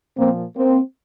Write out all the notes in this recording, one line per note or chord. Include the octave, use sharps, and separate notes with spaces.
A#2 F3 A#3 C4
A#3 C4